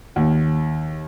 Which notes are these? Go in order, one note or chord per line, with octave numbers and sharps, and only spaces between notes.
D#2